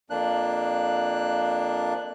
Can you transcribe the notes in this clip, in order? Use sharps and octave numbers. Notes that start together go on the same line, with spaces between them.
F2 A#3 D4 F#6